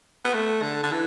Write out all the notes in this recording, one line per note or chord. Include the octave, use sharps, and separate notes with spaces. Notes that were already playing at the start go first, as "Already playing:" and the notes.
B3
A3
D3
D3
E3